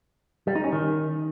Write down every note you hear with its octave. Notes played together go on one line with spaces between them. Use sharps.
G3
D#4
C#4
D#3